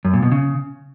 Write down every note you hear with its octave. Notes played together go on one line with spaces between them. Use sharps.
F#2
A#2
B2
C#3